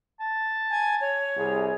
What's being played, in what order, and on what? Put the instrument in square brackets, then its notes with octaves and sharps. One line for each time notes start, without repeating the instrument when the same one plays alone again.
[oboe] A5
[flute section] G#5 G#6
C#5
[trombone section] C2 G#4